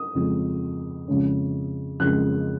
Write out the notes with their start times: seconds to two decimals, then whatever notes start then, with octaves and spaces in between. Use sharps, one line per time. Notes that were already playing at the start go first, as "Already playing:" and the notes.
Already playing: D#6
0.15 F2 C#3 G#3
1.08 F2 C#3 G#3 C#4
2.00 F2 C#3 G#3 C#4 F#6